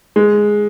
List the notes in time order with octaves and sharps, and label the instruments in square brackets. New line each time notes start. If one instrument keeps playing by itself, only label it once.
[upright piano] G#3